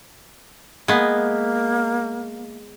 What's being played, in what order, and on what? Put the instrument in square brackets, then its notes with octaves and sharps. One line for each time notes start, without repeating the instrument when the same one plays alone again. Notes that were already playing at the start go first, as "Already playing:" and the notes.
[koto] G#3 B3 [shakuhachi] A#3